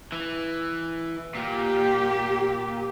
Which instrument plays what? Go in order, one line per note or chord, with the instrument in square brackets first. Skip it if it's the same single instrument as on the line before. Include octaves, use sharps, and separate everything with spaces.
[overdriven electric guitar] E3
[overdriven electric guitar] A#2 [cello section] G4